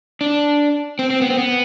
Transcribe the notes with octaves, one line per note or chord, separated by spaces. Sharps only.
D4
C4
C4
B3
C4
B3